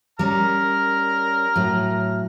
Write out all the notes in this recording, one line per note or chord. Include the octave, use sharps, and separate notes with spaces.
G3 C#4 A#5 F6
A2 F#3